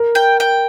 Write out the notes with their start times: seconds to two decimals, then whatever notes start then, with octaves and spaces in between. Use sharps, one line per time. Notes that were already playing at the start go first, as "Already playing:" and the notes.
Already playing: A#4
0.15 G5
0.40 G5